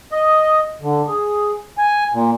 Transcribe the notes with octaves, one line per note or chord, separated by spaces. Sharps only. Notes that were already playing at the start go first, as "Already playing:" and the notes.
D#5
D3
G#4
G#5
A#2